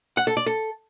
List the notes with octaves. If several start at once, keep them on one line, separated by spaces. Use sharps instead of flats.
F#5
A4
D5
A4